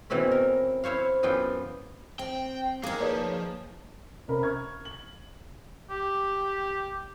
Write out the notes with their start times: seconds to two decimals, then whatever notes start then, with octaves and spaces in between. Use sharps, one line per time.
0.10 B2 E3 A3 C4 C#4
0.31 A#4
0.84 E4 C5 C#5 F5
1.23 F#2 E3 B3 F4 G5 C6
2.19 C4 G5
2.84 G#3 A#3 D#4 G#4
3.00 F3 B4 C#5 D5
4.28 C3 C#4 A#4 B5
4.43 C#6 F6 G#6
4.85 F#7
5.90 G4